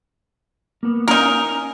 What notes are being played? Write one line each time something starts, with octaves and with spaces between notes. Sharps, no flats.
A#3 B3
C#4 D#4 A#4 G#5